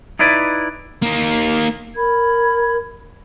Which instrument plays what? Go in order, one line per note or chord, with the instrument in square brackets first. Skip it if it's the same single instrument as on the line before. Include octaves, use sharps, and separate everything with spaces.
[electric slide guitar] D#4 E4 B4 D5
[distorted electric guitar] A#3 D#4
[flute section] A#4 B5 G#6